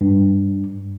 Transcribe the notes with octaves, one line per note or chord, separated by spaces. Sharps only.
G2